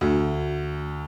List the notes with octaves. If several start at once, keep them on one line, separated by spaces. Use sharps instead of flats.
D2